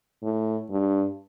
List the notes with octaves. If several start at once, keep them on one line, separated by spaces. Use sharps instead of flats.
A2
G2